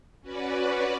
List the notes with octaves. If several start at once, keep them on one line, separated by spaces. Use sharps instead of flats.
C#4 F#4 B4 D5